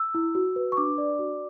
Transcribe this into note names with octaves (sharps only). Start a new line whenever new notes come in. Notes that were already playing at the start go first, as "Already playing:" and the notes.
Already playing: E6
E4
F#4
B4
C#6
D4 D6
D5
F#4